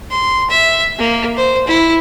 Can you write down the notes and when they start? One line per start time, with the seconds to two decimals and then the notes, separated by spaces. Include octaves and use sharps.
0.11 C6
0.50 E5
0.99 A#3
1.37 C5
1.68 E4